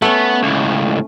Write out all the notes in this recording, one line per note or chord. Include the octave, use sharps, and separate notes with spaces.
A3 B3 C#4
C#2 A2